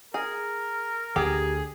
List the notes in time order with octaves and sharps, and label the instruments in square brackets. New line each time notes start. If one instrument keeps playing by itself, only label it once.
[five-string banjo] G#4 [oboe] A#4
[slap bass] D2 D3 [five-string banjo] G4 [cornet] G#4